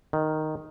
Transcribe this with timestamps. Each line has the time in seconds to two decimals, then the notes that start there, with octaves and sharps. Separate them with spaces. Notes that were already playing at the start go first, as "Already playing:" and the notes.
0.13 D#3